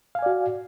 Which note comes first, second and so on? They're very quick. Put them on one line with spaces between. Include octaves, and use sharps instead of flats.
F5 G#5 D5 F#4